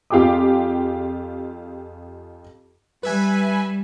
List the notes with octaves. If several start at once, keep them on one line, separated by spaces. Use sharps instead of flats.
F2 F4 G4 G#4 G5 D6
G3 B4 E5 G#5